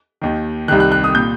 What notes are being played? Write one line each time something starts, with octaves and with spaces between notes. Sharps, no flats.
D#2 D#3
C2 C3 D#3 F#6
F#6
F#6
D#6
A#2 G6